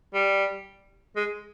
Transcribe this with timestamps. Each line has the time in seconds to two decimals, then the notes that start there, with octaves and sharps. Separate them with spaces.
0.14 G3
1.16 G#3